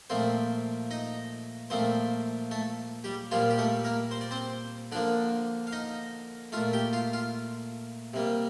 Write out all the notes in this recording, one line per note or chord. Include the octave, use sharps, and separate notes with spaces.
A#2 F3 A3 C4 C5
D#4 D#5
A#2 F3 A3 C4 C5
A3 A4
G3 G4
A#2 F3 G3 A#3 F4
G4
A3 A4
A#3 A#4
C5
D5
C4 C5
D3 F3 A#3 D4 D5
F5
D#4 D#5
A#2 A3 F4 F5
G4 G5
F4 F5
F4 F5
C3 G3 A#3